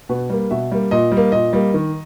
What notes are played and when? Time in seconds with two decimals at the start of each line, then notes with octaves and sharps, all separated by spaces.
0.09 B2 B4
0.30 G3 A#3
0.51 B2 E5
0.71 G3 A#3
0.91 A#2 D#5
1.12 G3
1.17 A#3
1.32 A#2 D#5
1.53 G3 A#3
1.74 D#3